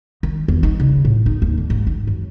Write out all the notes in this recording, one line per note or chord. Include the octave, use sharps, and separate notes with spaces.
D#3
E2
D#4
C#3
A2
D#4
D#2
D3
G#2
D#3
F#2